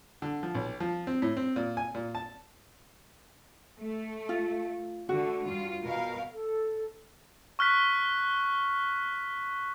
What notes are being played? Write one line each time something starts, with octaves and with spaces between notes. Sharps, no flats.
D3
F3
B1
F3
C4
A2
C4
A#2
G#5
A#2
A5
A3
F4
D3 A3 F#4
G2 F4
B2 A#4 F5
A4
C#6 F6 F#6 B6